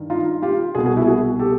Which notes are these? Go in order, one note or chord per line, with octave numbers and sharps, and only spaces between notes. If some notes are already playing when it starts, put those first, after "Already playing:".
Already playing: G2 D#3
D#4 F4
F4 G4
C2 B2 F#4 G#4
F#4 G#4
E4 F#4
F#4 G#4
G4 A4